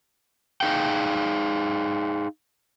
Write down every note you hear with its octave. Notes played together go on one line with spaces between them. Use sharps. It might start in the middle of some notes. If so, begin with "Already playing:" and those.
D#4 G#4 F5 G5